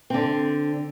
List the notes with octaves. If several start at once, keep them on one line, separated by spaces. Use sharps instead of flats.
D3 C4